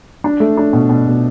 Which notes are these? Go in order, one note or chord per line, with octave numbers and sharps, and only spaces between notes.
D4
A3
D4
B2
B2
B2